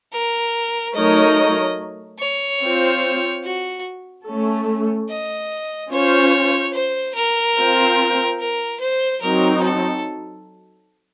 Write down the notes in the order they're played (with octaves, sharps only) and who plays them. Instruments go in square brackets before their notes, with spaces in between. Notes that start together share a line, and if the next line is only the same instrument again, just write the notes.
[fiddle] A#4
[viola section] F#3 A3 D#4 A#4 C#5 [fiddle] D#5
[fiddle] C#5
[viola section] C4 F4 C5
[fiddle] F#4
[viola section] A3 C#4 A4
[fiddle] D#5
[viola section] C#4 F4 C5 [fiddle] C#5
[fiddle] C5
A#4
[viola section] C4 F4 C5
[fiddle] A#4
C5
[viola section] F#3 C4 D#4 [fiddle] A#4
[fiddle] A4